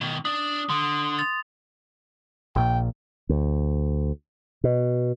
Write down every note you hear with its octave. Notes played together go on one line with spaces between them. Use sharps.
B2 D#3
D4 D5 D#6
D3 C6 D#6
A6 F7
A#1 A#2 G5
D2
B2